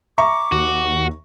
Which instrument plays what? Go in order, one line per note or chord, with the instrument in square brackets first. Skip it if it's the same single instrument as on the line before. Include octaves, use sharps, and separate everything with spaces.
[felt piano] E5 A#5 C#6 [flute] D6
[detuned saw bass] D#2 [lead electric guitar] F#4